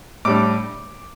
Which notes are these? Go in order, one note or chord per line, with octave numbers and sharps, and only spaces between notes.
A2 G3 D4 D6